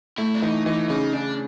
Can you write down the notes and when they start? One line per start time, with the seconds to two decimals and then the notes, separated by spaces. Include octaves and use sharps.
0.18 A3 E4
0.34 D4
0.42 E3 D#4
0.66 E3 D#4
0.90 C#3 D#4
1.14 C#3 D4